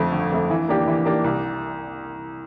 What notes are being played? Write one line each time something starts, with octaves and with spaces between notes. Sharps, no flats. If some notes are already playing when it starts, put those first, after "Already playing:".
Already playing: F2 D3 A3
G1
F2 D3 A3
E3
A#3 D4 G4
E3
A#3 D4 G4
C2